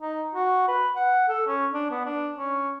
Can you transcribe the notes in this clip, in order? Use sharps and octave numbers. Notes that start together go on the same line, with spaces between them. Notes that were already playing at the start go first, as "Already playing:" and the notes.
D#4
F#4
B4
F#5
A4
C#4
D4
B3
D4
C#4